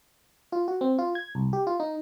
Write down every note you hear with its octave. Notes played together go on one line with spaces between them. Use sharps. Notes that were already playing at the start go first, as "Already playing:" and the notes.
F4
F#4
C4
F4
G#6
C2
G4
F4
D#4